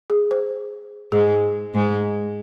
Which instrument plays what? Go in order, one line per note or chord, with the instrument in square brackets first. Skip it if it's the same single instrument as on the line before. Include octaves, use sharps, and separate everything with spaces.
[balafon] G#4
C5
[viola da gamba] G#2 G#3 [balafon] G#4
[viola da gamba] G#2 G#3